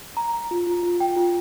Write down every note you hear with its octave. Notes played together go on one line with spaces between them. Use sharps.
A#5
A#5
F4
F4
F4
G5
F4